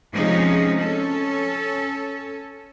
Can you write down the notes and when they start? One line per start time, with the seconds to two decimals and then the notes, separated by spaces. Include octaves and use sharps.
0.14 C3 F3 G#3 C#4 D#4 G#4
0.78 C#4 A4